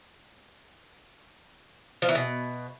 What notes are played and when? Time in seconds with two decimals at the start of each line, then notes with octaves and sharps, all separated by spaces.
2.02 F3
2.09 E3
2.15 B2